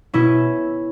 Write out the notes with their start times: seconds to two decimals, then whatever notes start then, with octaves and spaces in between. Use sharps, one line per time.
0.14 B2 C#4 E4